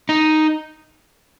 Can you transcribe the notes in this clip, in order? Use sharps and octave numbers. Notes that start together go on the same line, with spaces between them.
D#4